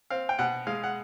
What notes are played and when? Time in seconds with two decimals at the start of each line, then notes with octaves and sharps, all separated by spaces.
0.10 C4 F5
0.29 G5
0.39 B2 F#5
0.67 G#3 F5
0.84 F#5